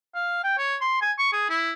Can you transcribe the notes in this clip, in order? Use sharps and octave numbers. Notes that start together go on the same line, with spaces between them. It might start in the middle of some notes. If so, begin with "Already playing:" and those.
F5
G5
C#5
C6
G#5
C#6
G#4
E4